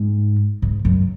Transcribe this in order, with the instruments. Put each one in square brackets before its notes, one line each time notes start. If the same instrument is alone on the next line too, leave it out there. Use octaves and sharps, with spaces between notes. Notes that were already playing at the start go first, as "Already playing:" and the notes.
Already playing: [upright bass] G#2
G#2
F#2